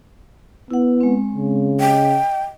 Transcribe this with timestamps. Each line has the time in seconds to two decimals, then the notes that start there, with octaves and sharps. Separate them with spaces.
0.71 B3 E4 F#5
1.01 G#3 C4
1.35 C#3
1.80 D#5 G5